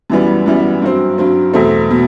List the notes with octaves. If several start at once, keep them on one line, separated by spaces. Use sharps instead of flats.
F#2 E3 G3 B3
F#2 E3 G3 B3
G2 F#3 C4
G2 F#3 C4
E2 B2 A3 C4
B2